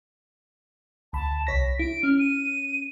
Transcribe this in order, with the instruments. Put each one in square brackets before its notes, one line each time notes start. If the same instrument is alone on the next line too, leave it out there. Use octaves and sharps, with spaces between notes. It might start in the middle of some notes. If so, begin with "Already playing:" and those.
[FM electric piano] D2 B5 [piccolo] A5
[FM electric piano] C2 C#5 A#6 [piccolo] B6
[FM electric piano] E4 [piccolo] D7
[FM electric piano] C#4 [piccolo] F6
[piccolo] D#7